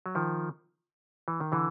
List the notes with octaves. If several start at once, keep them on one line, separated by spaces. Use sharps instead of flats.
F#3
D#3 F3
E3
D#3
D3 E3